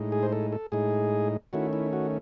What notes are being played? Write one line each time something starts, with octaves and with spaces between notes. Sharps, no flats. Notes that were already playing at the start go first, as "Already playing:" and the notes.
Already playing: A2 G#3 D#4
G#4
C5
A4
A4
A2 G#3 D#4 G#4
D#3 A3 C#4 E4 F#4
E4
F#4